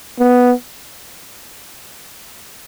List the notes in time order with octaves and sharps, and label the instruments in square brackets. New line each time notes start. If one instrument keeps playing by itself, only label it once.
[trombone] B3